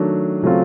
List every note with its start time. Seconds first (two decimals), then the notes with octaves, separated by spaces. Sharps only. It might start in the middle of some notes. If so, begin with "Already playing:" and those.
Already playing: D#3 F#3 A3 D4
0.42 C#3 F#3 A3 C4 F4